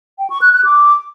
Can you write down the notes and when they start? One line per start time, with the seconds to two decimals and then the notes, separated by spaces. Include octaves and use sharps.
0.19 G5
0.30 C#6
0.42 F#6
0.53 F#6
0.64 D6